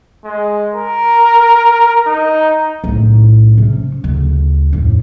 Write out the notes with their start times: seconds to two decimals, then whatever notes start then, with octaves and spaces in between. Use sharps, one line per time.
0.25 G#3
0.75 A#4
2.07 D#4
2.84 B1 A2
3.57 C3 C#4
4.04 D2 C#3
4.73 F2 A2